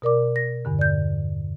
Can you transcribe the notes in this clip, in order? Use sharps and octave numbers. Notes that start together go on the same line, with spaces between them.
B2 A#4 D5 D6
A#6
E2 G2 D3
D5 G6